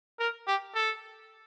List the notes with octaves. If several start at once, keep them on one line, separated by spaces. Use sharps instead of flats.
A#4
G4
A4